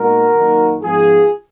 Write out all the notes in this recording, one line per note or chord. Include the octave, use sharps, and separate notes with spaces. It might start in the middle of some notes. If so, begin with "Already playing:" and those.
Already playing: A#2 G#3 B3 D#4 F#4 A#4
F#2 D#3 A#3 D#4
G#2 F3 B3 F4 G#4